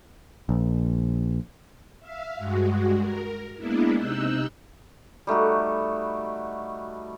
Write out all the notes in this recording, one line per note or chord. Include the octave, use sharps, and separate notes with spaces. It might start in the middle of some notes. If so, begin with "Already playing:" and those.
A#1
E5 F5
G2 G#3 F#4
A#4
G#3 A#3 B3 D4 E4
C3 D#4 E6 F#6 G6
G3 A3 D#4 F#4